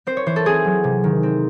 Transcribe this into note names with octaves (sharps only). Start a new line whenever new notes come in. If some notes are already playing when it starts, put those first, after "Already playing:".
C4 C5
C#5
E3 C5
A4
C4 G#4
F#3
C3
D#3
C4